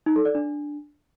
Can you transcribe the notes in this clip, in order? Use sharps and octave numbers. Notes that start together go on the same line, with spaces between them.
D#4
A4
D5
D4